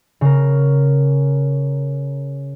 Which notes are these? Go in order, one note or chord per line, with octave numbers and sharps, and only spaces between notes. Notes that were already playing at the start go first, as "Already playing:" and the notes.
C#3 A#4